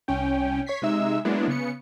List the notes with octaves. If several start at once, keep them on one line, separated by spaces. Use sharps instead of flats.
C2 C#4 G5
C#5 C#6 G#6 B6 C7
C3 G#3 D#4 E5 E6
F#3 G#3 A#3 B3 D4 E4
C#3 B3 C#7